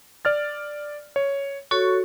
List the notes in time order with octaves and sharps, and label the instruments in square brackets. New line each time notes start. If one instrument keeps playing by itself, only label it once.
[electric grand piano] D5 F6 A6
C#5
[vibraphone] F#4 A4 C#5 [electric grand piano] C#6